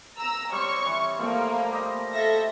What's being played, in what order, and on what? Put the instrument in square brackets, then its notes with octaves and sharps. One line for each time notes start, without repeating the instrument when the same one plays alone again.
[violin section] A#5 E6
[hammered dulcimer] G3 C4 [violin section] C#5 C#6
[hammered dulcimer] E3
[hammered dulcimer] F3 G3 A3 [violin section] A#3
[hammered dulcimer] G4 D#5
[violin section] A4 E5 A#6